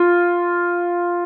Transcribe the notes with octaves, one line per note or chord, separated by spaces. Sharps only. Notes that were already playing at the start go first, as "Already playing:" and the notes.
Already playing: F4